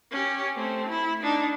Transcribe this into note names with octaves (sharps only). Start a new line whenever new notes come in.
C#4 G4
A3 C4
E4
D4 D#4